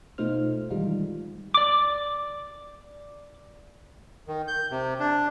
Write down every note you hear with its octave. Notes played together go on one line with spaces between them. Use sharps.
B2 A3 D#4 F4 C5 F6
D#3 E3 G3 G#3 D#4 F4
D5 D6
D#3
G6
C3
D4